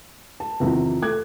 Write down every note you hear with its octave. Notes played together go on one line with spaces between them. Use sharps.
A5
E2 C3 D#3 F3
A3 D6 F#6 G#6